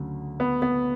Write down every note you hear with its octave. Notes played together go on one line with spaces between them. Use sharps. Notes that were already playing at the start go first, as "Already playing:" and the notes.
Already playing: D2 C#3 F#3
B3
B3